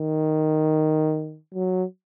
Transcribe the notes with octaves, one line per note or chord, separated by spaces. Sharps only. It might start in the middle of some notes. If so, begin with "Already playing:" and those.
Already playing: D#3
F#3